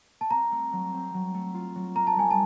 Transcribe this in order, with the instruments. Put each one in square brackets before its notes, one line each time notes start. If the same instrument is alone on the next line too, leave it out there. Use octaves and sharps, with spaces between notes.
[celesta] A5
[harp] C4 [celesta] A#5
[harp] A3
F#3
C4
F#3
A3
F4
F#3
[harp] A#4 [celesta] A#5
[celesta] A5
[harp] G3 [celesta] G#5
[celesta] A5